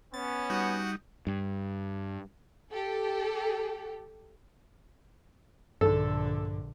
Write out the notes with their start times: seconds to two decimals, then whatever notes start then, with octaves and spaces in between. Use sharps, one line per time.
0.14 B3 C#4 A6
0.50 G3 D#4 F#4 F#5
1.27 G2
2.72 G4 A4
5.81 A#1 G2 D3 A4